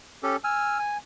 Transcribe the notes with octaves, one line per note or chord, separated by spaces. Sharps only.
C#4 G4 A4
G#5 E6 F6
G#5